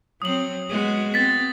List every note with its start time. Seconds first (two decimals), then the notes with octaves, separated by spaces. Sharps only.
0.22 F#3 C4 D#6 F#7
0.69 G#3 B3 F#4
1.14 B3 C4 A6 B6